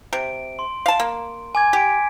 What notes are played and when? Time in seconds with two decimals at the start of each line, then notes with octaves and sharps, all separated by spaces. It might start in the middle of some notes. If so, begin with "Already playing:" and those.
0.13 C3 D7
0.59 C6
0.86 F5 A5
1.00 A#3
1.55 G#5 D6 G#6
1.73 G4 B6 D7